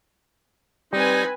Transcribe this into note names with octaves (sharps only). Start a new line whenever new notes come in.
G3 C4 D#4 B4 G#5